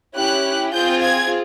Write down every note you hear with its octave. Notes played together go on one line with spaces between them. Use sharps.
C#4 E4 G4 F#6
C4 F4 G#4 G6
G#6